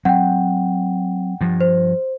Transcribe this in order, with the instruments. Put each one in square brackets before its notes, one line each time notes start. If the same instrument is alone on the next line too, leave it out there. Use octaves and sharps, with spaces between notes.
[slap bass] F#3 C4 [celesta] F#5 G5
[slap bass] G2 F3
[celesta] C5